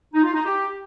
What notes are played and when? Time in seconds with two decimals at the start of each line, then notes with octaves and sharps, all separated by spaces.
0.14 D#4
0.23 F4
0.34 D#4
0.45 G4